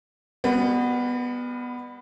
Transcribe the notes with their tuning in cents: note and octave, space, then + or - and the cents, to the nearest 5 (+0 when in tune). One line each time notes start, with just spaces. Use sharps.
G3 +40 B3 +0 F#4 +0